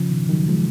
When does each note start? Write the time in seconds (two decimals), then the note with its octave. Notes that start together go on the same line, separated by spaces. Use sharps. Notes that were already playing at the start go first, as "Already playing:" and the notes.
Already playing: C#3 F3
0.10 B2 D#3
0.29 D#3 F#3
0.48 F3 G#3